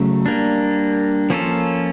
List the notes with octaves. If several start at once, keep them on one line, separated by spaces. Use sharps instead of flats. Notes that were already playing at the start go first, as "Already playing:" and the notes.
Already playing: C#3 F#3 A3
G3 A#3 D4
F3 A#3 C#4 F4 A4